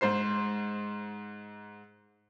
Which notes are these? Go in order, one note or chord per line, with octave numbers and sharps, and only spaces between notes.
G#2 C5 C7